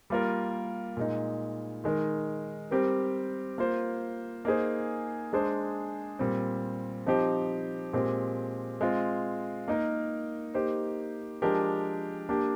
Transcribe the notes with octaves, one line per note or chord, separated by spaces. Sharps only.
G3 A#3 F4 A#4
A#2 G#3 D#4
D#3 G#3 D#4 A#4
G3 C4 G4 A#4
A#3 F4 C5
A#3 D#4 G#4 C5
G#3 D4 G#4 C5
A#2 G3 C4
F3 C4 D#4 G4 C5
A#2 G#3 C4 G4
G#3 C4 F4
A#3 D#4 A#4
A#3 D#4 G4 C5
F3 G#3 D4 G4 A#4
A#3 D4 G4